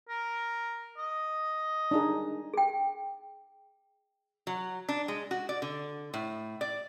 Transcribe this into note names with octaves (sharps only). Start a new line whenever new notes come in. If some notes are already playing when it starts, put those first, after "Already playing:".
A#4
D#5
D4 D#4 G#4
G#4 G5
F#3
D4
G#3
F#4
D5
D3
A2
D5